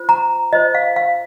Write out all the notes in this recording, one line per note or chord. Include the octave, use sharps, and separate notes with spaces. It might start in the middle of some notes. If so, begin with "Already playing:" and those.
Already playing: F4 C5
A#5
F4 C5 D#5
F5
F5